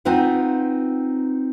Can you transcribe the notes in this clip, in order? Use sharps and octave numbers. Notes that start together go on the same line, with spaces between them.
C4 D#4 F4 B4 F#5